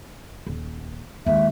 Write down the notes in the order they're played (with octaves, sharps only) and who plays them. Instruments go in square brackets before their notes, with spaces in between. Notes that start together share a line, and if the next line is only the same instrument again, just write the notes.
[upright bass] D#1
[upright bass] D#2 G#3 [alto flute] E5